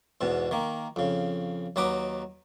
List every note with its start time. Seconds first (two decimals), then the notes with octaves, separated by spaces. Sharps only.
0.21 E2 G#2 B2
0.51 D#3 A#3
0.96 F2 C#3
1.76 D#2 F#3 D#4 B4 D6